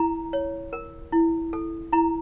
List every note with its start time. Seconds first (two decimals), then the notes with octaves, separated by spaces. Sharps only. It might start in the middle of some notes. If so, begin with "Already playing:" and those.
Already playing: E4 A#5
0.33 C#5
0.73 A#4
1.12 E4
1.53 A4
1.93 E4 A#5